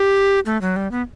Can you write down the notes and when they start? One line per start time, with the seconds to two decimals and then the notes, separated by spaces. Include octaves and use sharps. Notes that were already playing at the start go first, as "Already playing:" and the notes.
Already playing: G4
0.46 A3
0.61 F#3
0.76 G3
0.91 B3